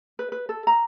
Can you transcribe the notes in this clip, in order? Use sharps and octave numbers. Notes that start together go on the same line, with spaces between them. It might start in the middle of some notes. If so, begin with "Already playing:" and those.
B4
B4
A4
A#5